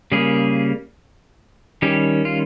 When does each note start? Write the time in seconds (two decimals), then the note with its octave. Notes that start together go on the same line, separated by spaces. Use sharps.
0.12 C#3 G3 A#3 G#4
1.82 D#3 G3 C#4 G4
2.25 F4